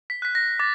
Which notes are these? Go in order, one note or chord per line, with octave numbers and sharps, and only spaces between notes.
B6
F#6 B6
A#6
D6 A6